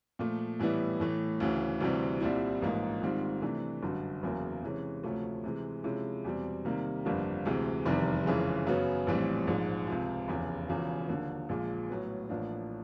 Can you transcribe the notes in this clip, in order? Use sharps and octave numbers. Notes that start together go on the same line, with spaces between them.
A#2 F3 A3
A2 E3 G3 B3 E4
A2 E3 A3
D2 C#3 E3
D2 C3 E3 G3 C4
C2 A#2 G3 C4 E4
A1 G#2 F3 A#3 D#4
G#2 D#3 G3 C4 F4
C3 E3 A3 D4
G1 F#2 D3 F#3
F#1 E2 C#3 F#3 A#3
C3 E3 G#3 C#4
D2 C3 F3 A3 C#4
C3 E3 G#3
C3 F3 G#3 C#4 E4
E2 B2 G3 C4
C3 D#3 G3 A#3
G1 F2 D3 G3 A#3
D2 C3 E3 G#3
F1 E2 C3 D#3 G3
F#1 F2 C#3 E3 G#3
F#2 C#3 F#3 B3
A#1 A2 E3 G3 C4
A#1 G#2 F3 G#3
C#2 C3 F3
F1 E2 C#3
E1 E2 C#3 F3
D#2 D3 F3 A#3
A#1 A#2 F3 G#3
A2 F#3 B3
A1 A2 F3 A#3 D4